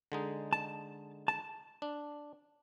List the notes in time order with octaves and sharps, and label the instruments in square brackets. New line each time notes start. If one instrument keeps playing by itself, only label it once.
[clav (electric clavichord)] D3 G#3 D#4
[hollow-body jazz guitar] A5
A5
[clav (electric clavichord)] D4